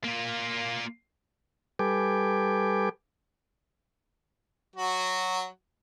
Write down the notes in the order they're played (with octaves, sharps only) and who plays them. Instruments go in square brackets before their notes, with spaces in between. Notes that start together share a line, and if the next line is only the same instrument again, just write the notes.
[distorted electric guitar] A#3 F4
[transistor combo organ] G3 A4 B4 G5 G#5 D6
[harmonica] F#3 F#4